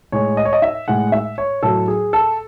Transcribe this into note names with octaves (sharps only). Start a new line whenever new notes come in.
A2 G#3 C#5
D#5
C#5
D#5
E5
A2 G#3 F#5
E5
C#5
A2 F#3 A3 A4
G#4
A4